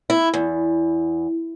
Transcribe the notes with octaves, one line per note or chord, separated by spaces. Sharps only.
E4
E2